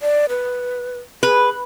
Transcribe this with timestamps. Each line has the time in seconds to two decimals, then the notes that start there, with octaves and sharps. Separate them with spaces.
0.02 D5
0.29 B4
1.23 G#4 B4